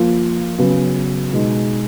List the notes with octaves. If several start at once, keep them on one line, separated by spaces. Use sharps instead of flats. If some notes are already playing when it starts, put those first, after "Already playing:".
Already playing: F3 A#3 F4
C#3 F#3 B3
B2 G#3 D#4